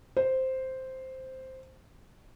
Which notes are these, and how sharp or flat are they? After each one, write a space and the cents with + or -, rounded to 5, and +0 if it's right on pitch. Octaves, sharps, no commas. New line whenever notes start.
C5 +0